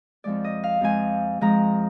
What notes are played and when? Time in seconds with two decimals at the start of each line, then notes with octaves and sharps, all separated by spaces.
0.24 F2 F3 G#3 D5
0.44 D#5
0.64 F5
0.81 F2 F3 G#3 G#5
1.41 F2 F3 G#3 A#5